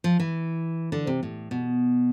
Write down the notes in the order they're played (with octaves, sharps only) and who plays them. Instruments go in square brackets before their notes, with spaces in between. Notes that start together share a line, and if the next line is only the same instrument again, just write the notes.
[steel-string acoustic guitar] F3
E3
D3
C3
A2
B2